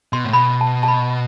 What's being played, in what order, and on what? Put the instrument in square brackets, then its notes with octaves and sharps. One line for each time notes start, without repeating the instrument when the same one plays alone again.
[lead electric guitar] B2 [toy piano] C6
[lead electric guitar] A2
[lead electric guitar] B2 [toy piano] B5
[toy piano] A5
A5
B5